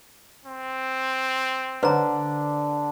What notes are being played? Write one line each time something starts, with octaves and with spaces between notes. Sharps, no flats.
C4
D3 B4 C5 A#5